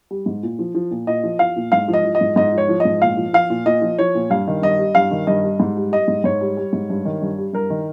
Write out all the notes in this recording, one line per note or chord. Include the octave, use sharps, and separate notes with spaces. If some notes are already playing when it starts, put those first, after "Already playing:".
G3
G#2
A#2
F3
F3
A#2
A#2 D#5
F3
F3 F5
A#2
G#2 F5
F3
D#5
F3
D#5
G#2
G#2 D#5
F3
C#5
F3
D#5
G#2
A#2 F5
F3
F3 F5
A#2
A#2 D#5
F3
F3 C#5
A#2
G2 F5
D#3
G2 D#5
G3
G2 F5
D#3
G2 D#5
G3
G#2
G3
G3 D#5
G#2
G#2 C#5
G3
G3
G#2
G2
D#3
G2
G3
G2 A#4
D#3